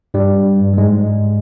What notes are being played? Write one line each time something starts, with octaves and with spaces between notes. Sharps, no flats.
G2 G3
G3
G#2 G#3